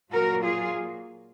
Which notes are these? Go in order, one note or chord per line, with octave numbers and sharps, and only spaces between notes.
A#2 F#3 A#3 F#4 A#4
F4 G#4